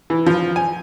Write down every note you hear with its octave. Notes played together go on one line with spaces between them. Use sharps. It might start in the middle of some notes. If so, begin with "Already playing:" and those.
E3
F3
G#5